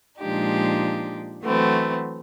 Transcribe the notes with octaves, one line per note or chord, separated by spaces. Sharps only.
A#2 F3 G#3 D4 D#4 G4
E3 F#3 A3 B3 C4